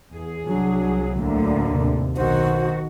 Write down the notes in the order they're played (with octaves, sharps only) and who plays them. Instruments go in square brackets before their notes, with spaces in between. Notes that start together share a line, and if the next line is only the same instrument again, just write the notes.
[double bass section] E2 [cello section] G#4
[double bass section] C2 F#3 [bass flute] D4
[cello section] D2 A2 D3 [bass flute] A#3
[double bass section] D#2 C3
[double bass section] B1 B2 [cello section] D#3 F#4 [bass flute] C5